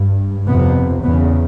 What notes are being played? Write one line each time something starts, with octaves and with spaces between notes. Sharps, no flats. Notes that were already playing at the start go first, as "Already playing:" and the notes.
Already playing: G2
F2 C3 B3
E2 C#3 B3